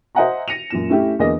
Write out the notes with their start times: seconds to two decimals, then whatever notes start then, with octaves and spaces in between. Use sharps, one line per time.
0.15 C5 D#5 E5 F#5 G#5 A#5
0.48 A#6 C#7 D#7 F7
0.70 F#2 A#2 E7
0.89 A3 C#4 E4 G4
1.19 E2 D3 A#3 G#4 D#5 A#6